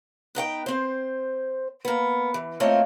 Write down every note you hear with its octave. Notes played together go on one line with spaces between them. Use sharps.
B3 D#4 F#5 G5
C4 C5
A#3 B3
E3
A3 A#3 C4 F4 C#5 D#5